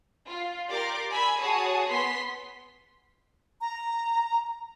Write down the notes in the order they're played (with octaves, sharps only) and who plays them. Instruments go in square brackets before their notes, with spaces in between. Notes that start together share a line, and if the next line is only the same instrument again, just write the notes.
[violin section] F4
G4 A#4 D5 C6 D6
G#5 B5 E6 B6
F#4 G#4 C#5 A5 D#6
B3 C6 B6
[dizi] A#5